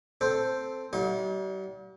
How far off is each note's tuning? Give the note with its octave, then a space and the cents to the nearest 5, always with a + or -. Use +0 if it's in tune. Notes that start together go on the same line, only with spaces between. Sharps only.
C4 +0 A4 +0 C5 +0
G3 -40 D#4 +45 F#5 -45